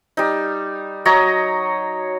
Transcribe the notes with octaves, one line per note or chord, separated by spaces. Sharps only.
G3 D#4
F#3 C#5 D#5 A#5